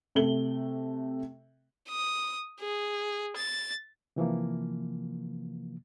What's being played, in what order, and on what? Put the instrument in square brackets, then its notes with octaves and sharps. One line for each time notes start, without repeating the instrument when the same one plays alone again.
[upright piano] C3 A3 F#7 G7
[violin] D#6
G#4
A6
[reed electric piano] C3 E3 F3 A#3